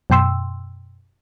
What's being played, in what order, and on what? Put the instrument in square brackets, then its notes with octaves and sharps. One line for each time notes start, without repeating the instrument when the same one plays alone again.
[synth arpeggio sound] F#2 B2 G5 C6 E6